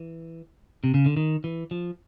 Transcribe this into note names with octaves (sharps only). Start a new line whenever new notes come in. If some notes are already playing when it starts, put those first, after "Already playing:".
Already playing: E3
C3
C#3
D3
D#3
E3
F3